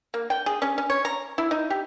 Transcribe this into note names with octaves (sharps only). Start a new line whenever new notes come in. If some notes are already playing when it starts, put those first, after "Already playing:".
A#3
G5
G#4
C#4
C#4
C#5
A#5
E4
D#4
G4